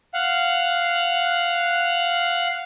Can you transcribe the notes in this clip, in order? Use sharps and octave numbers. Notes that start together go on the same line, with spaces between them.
F5 F#5